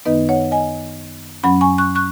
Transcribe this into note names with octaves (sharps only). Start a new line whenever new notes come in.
F#2 D#3 B3 D#4 B4 D#5
C#5 F#5
D#5 G#5
F#2 F#3 C#4 F#5 B5
G#5 C#6
C#6 F#6
C#6 F#6